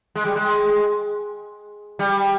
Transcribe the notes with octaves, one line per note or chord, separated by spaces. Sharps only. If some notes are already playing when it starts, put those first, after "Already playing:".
G#3
G3
G#3
G3